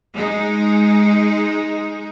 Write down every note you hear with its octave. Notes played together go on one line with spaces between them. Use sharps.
G#3 D#4